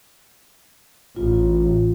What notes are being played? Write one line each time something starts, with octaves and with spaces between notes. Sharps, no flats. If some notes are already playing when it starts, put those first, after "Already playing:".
A1 F4